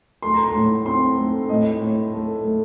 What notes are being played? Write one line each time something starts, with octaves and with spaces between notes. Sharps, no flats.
A3 C6
A#5
C6
A2
C4 C6
A3
A2 D#5
A2
A3
A3